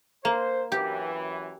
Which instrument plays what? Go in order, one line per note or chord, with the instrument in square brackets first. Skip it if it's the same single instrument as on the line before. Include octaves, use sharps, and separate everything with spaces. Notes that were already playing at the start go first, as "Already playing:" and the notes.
[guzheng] A#3 [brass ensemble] C5
[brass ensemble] F#2 E3 [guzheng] G4